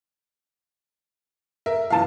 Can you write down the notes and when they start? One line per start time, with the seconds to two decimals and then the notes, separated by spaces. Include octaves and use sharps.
1.66 A#4 E5
1.90 F#2 E3 F3 F5 A5